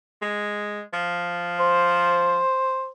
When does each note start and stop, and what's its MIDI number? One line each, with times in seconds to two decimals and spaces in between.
0.22 0.81 56
0.93 2.40 53
1.60 2.89 72